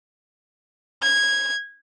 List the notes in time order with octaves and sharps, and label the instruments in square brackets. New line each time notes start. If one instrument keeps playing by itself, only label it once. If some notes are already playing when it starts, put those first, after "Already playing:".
[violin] G#6